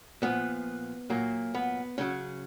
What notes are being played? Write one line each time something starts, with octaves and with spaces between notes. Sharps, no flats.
A#2 F3 B3
A#2 F#3 A#3
B3
C#3 F#3 C#4